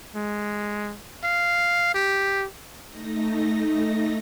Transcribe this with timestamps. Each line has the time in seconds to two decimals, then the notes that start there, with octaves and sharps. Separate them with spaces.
0.16 G#3
1.24 F5
1.95 G4
2.89 A3 D#4 A#6